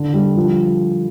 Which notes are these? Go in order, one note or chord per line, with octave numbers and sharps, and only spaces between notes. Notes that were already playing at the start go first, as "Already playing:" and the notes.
Already playing: D3
G3
F3